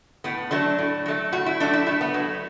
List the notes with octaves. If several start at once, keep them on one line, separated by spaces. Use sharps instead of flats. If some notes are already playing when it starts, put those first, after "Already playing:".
A2 B3
F#3 A3 D4
A2
F#3 A3
A2 F#4
E4
F#3 A3 D4
E4
A2 A3
B3
F#3 A3